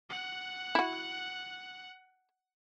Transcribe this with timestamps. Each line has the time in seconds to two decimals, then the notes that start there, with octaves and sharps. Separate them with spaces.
0.10 F#5 F#6
0.75 E4 F#4